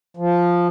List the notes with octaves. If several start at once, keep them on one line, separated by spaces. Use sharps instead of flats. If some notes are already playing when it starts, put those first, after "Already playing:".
F3